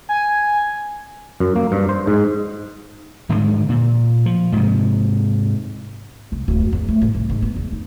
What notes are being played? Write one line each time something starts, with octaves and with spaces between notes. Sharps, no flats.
G#5
F#2
A#3
G2
C5
G#2
G#2 D3 D#3 G#3
A#2
F3
G#2 C3
C2
D1
F#2
E2
A3
A2
C2
G#2
B3
E2
D#4